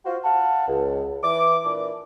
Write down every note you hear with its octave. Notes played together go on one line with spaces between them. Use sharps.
F4 F#4 C5
F5 F#5 A5
C#2
E3 D6
A#2 E3 D4 E4 D6